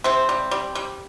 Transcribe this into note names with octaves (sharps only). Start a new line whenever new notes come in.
C3 C4
G3
G3
G3